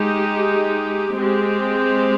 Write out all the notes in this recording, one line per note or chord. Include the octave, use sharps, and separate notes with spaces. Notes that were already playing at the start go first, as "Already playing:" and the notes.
Already playing: G#3 D#4 G4
G#3 C4 G4